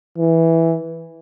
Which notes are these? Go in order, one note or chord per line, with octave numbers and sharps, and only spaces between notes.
E3